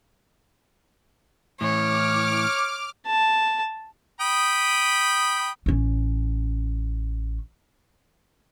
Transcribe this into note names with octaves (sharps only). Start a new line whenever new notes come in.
A2 E3 C#5 D6 F6
A5
G5 B5 D#6
A1 C#4